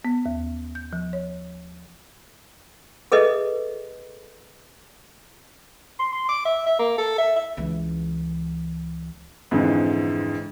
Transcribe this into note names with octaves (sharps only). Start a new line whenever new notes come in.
B3
D#2
G6
F3
C#5
G#4 A4 B4 D#5 E5
C6
C6
D6
E5
E5
A#3
A4
E5
E5
C#2 E3
F2 G#2 D3 E3